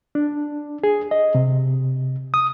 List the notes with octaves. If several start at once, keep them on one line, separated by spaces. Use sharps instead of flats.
D4
G#4
D#5
C3
D#6